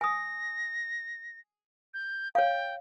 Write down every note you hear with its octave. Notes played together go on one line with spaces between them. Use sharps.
G#5 D#6 A#6
G6
C#5 F5 G5